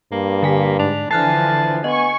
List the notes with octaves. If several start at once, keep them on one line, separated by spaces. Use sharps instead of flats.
G2 A#3
D3 G#5 B6
G#2 D4 F7
D3 E3 F3 G#5 A5 F6 F#6 C7
B3 D#5 G#5 C#6